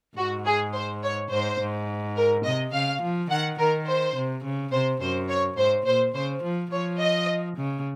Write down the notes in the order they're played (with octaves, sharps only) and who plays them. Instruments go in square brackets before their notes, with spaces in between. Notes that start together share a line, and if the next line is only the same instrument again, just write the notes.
[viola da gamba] G#2 [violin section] F#4
[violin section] G#4
C5
C#5
[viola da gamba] G#2 [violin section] C5
[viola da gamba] G#2
[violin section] A#4
[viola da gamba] C3 [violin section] D#5
[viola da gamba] C#3 [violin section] F5
[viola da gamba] F3
[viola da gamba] D#3 [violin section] F#5
[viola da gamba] D#3 [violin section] A#4
[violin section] C5
[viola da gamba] C3
C#3
[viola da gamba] C3 [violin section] C5
[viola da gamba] F#2 [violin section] C5
[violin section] C#5
[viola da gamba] G#2 [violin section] C5
[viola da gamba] A#2 [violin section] C5
[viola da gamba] C#3 [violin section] C5
[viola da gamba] F3
[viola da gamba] F3 [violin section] C#5
[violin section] D#5
[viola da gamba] C#3